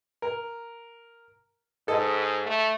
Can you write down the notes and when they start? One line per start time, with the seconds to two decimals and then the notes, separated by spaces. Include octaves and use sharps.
0.22 A#4
1.88 G#2 A4 D#5
2.46 A3